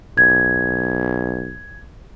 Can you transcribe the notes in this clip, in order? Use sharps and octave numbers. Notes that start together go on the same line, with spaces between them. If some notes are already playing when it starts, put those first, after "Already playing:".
B1 G#6